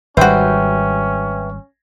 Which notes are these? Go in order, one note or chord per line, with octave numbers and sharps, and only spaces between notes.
G#1 G3 C#4 F#4 B4 C5 E5 G5